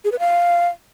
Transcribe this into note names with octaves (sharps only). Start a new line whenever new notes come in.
G#4
B4
F5